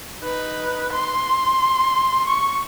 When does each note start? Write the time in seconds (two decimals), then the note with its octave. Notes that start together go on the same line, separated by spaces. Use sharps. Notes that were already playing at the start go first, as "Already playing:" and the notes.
0.22 D#4 B4
0.94 C6
2.27 C#6